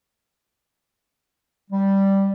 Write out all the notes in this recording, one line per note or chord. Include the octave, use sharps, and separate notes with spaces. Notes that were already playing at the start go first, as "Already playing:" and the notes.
G3